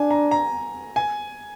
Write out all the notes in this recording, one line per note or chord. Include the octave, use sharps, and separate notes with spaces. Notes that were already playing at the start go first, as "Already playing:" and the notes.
Already playing: D4 G#5
A#5
A#5
G#5